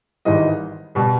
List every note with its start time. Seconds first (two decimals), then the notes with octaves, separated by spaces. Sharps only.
0.25 G#1 G#2 E3 G3 D#5
0.95 B2 G3